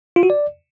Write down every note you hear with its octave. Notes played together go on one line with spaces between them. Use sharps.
F4
F#4
D5